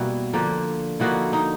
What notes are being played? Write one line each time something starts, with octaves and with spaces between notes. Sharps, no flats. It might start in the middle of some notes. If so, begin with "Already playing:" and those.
Already playing: B2 G3 A#3 E4 F#4
D3 F3 A#3
D3 F3 A#3 D#4 E4 F#4
D#4